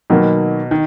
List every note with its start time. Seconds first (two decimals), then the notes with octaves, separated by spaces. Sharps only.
0.10 B2 D#3 F#3 A#3
0.71 D#3